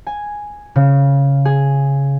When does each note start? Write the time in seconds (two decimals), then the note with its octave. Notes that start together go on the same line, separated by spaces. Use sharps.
0.07 G#5
0.76 C#3
1.45 G#4